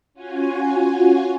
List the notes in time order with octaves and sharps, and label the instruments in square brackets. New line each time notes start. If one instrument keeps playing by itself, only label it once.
[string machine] C#4 F4 F#4 G#5